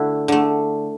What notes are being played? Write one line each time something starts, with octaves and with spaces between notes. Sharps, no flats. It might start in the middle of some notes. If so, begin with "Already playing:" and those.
Already playing: D3 A3 E4 F#4
D3 A3